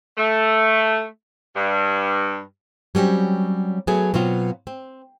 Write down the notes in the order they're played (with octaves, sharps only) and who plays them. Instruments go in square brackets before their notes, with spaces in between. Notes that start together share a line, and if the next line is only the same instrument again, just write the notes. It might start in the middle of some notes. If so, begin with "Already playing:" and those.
[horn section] A3
G2
[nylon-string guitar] F#3 G3 C4 C#4
F#3 A3 B3 G#4
B2 F#3 C4 F4
C4